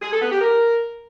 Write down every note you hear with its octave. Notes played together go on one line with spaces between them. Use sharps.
G#4
A4
B3
G4
A#4